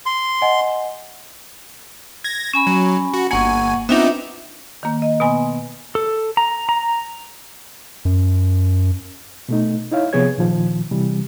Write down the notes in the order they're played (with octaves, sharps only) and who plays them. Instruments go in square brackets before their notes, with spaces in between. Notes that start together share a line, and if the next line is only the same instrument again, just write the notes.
[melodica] C6
[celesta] D#5 F#5 G#5
[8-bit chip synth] G#6 A#6
[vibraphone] C#4 G#5 B5
[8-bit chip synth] F#3
F#4
[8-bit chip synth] G1 G#5 [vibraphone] A#3 F#5 C#6
[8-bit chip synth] B3 C4 D#4 [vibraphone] D4 F4 E5
[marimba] D#3 A#3
D#5
B2 B3 G#5 C6
[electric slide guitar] A4
A#5
A#5
[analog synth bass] F#2
[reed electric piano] B2 A3 D#4
D#4 E4 C#5 F5
C3 F3 B3 G#4 C#5 G#6
A#2 D#3 F3
C3 E3 G3